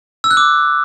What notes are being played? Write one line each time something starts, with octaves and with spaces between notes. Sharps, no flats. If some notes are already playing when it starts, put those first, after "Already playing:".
E6
F#6
D6